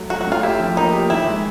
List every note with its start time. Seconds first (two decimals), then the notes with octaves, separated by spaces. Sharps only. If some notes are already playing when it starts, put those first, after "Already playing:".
Already playing: F#3 A3
0.10 F#3 F#4
0.21 F#4
0.27 A2 F4
0.43 E4 G4
0.60 F3
0.77 A#3 D#4
0.93 G4
1.10 D#3 E4
1.26 G#3